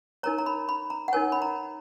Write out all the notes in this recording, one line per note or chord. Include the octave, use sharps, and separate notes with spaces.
D#4 A#4 C#5 A#5
A#5
B5
B5
A#5
F#5
D#4 A#4 C#5 G#5
B5
A#5